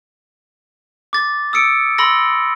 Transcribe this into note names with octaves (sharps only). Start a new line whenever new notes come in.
D6 A6
D#6 E6 C#7 D7
B5 C6 E6 A#6